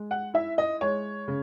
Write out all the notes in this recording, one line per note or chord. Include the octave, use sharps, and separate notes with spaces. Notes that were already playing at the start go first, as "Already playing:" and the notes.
Already playing: G#3
F#5
E4 E5
D#5
G#3 C#5
C#3